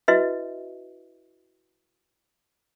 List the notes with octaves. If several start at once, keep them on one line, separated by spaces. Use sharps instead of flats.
E4 F#4 B4 D#5 E5